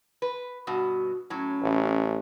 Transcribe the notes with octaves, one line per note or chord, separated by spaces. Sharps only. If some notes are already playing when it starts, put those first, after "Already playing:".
B4
G2 B2 F#4
A2 F#3 C#4
A1